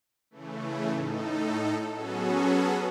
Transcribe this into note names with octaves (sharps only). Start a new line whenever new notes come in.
C#3 E3 A3
A2 D#4 A4
F#3 B3 C#4 F#4 G#4 A4